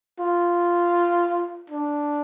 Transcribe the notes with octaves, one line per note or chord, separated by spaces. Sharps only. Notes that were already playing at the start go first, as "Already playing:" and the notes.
F4
D4